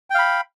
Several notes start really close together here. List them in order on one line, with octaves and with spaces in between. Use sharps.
G5 F5 B5